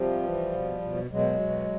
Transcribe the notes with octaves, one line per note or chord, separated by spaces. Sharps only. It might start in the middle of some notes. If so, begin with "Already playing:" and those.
Already playing: C3 F3 G3
E3
B2
B2
B2 F#3 G#3
B2